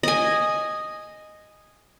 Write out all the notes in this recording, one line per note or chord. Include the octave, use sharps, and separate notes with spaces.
D#5 G#5